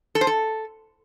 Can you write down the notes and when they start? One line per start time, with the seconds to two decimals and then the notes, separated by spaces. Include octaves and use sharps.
0.15 A4
0.21 C5
0.27 A4